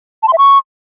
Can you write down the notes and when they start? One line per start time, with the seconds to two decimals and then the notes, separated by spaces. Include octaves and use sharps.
0.23 A5
0.28 C6
0.33 E5
0.38 C#6